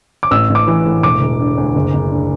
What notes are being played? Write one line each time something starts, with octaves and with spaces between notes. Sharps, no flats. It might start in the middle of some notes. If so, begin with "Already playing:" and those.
D6
A1 E6
A1
D6
E3
A2
E1 D6
E1
D3
D2
F#1
F#1
D3